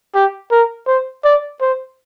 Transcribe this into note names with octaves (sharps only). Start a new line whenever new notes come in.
G4
A#4
C5
D5
C5